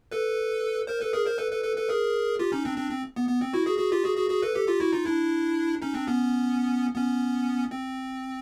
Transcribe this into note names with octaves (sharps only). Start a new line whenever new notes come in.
A4 B4
A#4 C5
A4 B4
G#4 A#4
A#4 C5
A4 B4
A4 B4
A4 B4
A4 B4
G#4 A#4
F4 G4
C#4 D#4
C4 D4
C4 D4
C4
B3
B3
C4
E4 F#4
F#4 G#4
F#4 G#4
F4 G4
F#4 G#4
F#4 G#4
F#4 G#4
A4 B4
G4 A4
F4 G4
E4 F#4
D#4 F4
D4 E4
C#4 D#4
C4 D4
B3 C#4
B3 C#4
C4